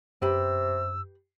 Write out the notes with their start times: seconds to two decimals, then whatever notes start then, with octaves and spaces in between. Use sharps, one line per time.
0.22 F#2 C3 G4 B4 B5 E6